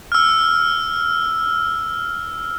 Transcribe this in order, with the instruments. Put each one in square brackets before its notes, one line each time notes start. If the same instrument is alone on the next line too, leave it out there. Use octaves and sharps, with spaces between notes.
[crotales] E6 F6